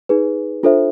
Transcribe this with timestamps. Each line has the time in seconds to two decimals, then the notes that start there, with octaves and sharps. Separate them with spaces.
0.09 D#4 G#4 B4
0.63 D4 F4 A4 C5 E5